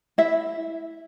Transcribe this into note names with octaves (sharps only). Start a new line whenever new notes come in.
E4 E5